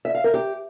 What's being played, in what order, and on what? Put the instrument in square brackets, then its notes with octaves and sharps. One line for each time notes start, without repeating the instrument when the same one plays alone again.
[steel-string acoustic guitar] E5
F5
A#4
G4